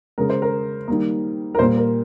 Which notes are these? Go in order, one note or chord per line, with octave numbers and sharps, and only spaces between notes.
C#3 G#3 A#4
C5
A#4
D#3 G3 A#3
A#4
A#2 G3 A#3 C5
A#4